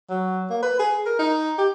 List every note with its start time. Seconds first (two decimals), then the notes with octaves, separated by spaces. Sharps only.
0.10 F#3
0.50 A#3
0.62 B4
0.79 G#4
1.06 A#4
1.19 D#4
1.58 G4